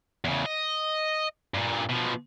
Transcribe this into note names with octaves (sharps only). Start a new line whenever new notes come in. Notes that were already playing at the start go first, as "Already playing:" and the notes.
E2 C#3
D#5
G2 A#2
B2 F3